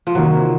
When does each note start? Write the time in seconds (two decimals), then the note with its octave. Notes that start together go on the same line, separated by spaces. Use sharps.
0.07 F3
0.15 C3 D#3 F#3 A#3